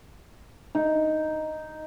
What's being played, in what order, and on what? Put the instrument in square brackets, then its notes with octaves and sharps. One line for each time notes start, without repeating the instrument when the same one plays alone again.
[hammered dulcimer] D#4